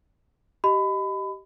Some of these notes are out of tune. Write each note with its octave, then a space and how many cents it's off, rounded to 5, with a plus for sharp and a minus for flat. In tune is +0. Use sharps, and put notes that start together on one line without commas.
G4 -20 D#5 +0 B5 +25